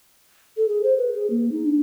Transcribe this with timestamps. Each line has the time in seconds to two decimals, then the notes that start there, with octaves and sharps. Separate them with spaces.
0.57 A4
0.68 G#4
0.83 C5
0.98 B4
1.14 G#4
1.30 A#3
1.52 D#4
1.65 D4